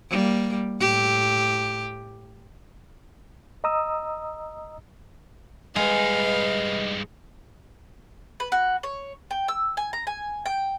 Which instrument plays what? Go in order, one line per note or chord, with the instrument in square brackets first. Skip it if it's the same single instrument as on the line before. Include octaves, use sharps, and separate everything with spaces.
[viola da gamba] G3 A#3
A2 G4
[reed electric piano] D#5 A#5 D#6 E6
[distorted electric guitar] G2 D#4 [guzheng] G#3 [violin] B4 F5 [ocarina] D#5
[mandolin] B4
F#4
C#5
G5
E6
G#5
A#5
G#5
G5